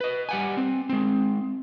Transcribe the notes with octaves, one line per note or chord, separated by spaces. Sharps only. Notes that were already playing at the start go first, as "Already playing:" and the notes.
B4 D#5
G3 F#5 G#5
C4
G#3 C4